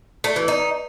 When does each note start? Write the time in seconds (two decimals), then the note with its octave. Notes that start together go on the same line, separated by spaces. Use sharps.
0.24 A3
0.36 E3
0.48 D#4